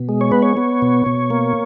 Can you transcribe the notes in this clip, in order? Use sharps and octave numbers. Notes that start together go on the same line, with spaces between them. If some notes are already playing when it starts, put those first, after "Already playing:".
Already playing: B2
G#3
C#5
B3 B4
C#5
B3
B2
B2
A#3